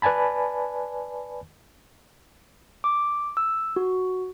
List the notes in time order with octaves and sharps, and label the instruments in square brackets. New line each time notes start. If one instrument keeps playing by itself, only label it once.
[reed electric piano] B4 D5 G#5 A5 B5
[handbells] D6
E6
F#4